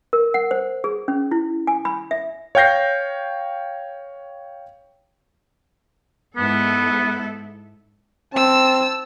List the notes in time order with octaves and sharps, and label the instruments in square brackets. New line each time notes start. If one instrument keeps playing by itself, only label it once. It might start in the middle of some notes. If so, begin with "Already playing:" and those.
[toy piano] A#4
F#5
C5
G#4
C#4
E4
G#5
B5
E5
[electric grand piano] C#5 F5 G5 G6 A#6 C7
[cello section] G#2 E4 A4 [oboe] B3
[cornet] C4 [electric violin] A5 E6